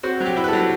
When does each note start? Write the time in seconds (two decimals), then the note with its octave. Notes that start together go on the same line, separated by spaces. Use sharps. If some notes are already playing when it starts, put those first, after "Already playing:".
0.03 C4 F#4
0.20 F#3
0.26 G4
0.37 E4
0.44 B4
0.48 A4
0.53 F#3